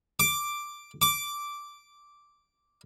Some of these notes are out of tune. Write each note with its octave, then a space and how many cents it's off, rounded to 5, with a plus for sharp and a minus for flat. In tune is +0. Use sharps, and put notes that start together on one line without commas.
D6 +5
D6 -5